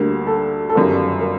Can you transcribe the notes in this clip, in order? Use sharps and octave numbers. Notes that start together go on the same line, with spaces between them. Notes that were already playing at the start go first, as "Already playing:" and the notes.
Already playing: D2 D3 G3 A#3
A4
A4
G1 F#2 D#3 G3 A#4
A#4